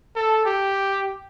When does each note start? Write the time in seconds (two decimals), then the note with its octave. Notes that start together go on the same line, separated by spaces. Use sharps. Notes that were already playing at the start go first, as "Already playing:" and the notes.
0.16 A4
0.45 G4